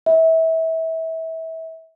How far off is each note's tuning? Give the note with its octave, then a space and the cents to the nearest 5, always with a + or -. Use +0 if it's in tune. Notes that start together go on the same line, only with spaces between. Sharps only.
E5 -25